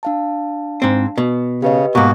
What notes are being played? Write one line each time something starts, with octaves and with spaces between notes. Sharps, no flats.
D4 F5 A5
G#2 C4
B2
C#3 G4 B4 D#5
G#2 B2 A#3 F#4